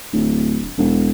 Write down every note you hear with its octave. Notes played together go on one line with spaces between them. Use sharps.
D1
E1